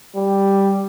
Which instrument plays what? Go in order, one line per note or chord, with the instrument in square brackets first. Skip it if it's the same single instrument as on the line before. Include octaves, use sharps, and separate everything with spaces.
[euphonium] G3